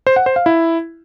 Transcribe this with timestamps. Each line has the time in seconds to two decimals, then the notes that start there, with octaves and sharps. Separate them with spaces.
0.07 C5
0.16 F#5
0.26 C5
0.36 F5
0.46 E4